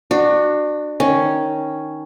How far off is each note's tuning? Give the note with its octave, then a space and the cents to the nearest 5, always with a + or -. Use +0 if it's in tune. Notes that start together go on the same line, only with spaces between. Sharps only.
D4 +30 F#4 +0
D#3 +0 C#4 +0